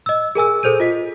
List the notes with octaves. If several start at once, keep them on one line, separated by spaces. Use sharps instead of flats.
D#5 E6
G#4 A#4 G#5 E6
G#4 A4 C5 G6 D#7
F4 D#5 B6